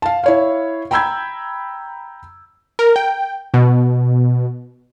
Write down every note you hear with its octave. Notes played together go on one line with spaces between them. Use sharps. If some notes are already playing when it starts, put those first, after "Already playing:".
F5 A5
E4 C#5 F5
G5 A#5 B5 E6 G6 G#6
A#4
G5
B2